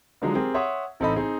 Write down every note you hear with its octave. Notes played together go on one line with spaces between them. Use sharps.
D3 F3 F#3 G#3 D#4
C4 G4 G#4 A#4
C#5 E5 F#5 C6 D#6
A1 C4 D#4 A4 D#5 B5
C4 D#4 G#4